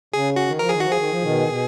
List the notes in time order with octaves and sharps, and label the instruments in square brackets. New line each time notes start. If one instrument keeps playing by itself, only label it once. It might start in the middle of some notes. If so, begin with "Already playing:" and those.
[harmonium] C#3 [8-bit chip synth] G#4
[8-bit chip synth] F#4
[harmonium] D#3
[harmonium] F3 [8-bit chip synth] A#4
[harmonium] D#3 [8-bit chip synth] G#4
[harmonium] F3 [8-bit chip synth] F#4
[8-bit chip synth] G#4
[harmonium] D#3
F3
B2 D#3
B2